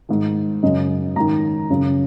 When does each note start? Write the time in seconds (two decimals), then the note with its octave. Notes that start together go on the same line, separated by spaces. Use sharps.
0.09 G#2 D#3
0.63 F#2 C#3 D#5
1.16 G#2 D#3 A#5
1.70 F#2 C#3